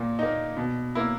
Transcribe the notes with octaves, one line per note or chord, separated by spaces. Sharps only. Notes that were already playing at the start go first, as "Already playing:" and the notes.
Already playing: A#2 A#3
A#3 D#4
B2
A#3 E4